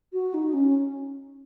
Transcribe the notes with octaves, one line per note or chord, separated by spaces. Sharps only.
F#4
D#4
C#4